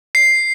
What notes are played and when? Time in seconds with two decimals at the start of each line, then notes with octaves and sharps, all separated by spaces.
0.15 C7